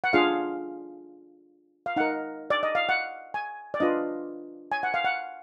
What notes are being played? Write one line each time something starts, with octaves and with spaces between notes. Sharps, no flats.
F#5
D4 F4 G#4 F5
F5
D#4 A#4 F#5
D5
D#5
F5
F#5
G#5
D5
D4 F4 B4 D#5
G#5
F#5
F5
F#5